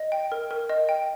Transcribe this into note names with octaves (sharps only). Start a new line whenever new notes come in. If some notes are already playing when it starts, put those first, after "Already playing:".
Already playing: D#5
G5
A#4
A#4
D#5
G5